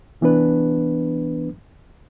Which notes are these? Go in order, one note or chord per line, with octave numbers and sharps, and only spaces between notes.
C2 E3 B3 D4 B4